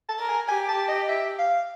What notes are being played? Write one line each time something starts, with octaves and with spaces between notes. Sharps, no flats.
A5
A#4
G#5
G4 G#5
A5
D#5
E5
F5